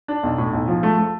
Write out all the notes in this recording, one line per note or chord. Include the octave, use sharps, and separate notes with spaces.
D4
B1
A2
B1
F3
A3
A3